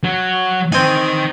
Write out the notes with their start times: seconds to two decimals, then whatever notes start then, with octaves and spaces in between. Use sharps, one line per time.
0.04 F#3
0.72 C4 D#4 G5 G#5